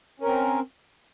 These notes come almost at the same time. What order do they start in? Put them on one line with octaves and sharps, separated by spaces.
C#4 A#4 C4